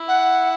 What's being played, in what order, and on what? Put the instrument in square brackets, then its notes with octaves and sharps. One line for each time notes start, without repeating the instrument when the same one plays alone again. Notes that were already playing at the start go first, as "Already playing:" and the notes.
Already playing: [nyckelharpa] E4
[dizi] F#5